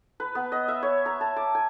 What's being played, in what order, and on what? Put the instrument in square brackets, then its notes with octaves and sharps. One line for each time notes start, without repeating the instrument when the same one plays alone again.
[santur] B4
B3
D#5
E5
C#5
A#5
A5
D6
G#5